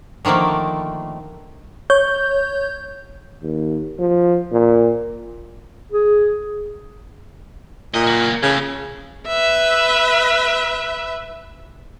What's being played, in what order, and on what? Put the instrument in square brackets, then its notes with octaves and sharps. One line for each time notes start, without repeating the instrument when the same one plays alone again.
[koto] D3 D#3 F3 A3 A#3
[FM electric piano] C#5 G6
[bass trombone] D#2
F3
A#2
[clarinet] G#4
[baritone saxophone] A#2 [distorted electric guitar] D#5
[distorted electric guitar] A#3 F#4
[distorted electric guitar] A2 [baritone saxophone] C#3
[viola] B4 E5